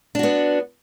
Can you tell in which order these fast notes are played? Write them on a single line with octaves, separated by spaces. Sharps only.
D4 F#4 B3